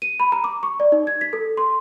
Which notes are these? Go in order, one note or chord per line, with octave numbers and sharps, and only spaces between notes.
D#7
B5
A#5
D6
C#6
D5
D#4
G#6
B6
A4
C6